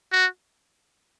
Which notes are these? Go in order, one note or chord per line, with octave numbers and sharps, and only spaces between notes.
F#4